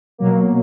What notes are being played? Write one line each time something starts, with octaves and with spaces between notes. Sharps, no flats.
B2 F#3 A#3